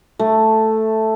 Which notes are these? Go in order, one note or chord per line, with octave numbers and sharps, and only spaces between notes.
A3